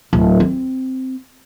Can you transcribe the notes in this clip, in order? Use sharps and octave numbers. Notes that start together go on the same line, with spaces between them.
D1
C4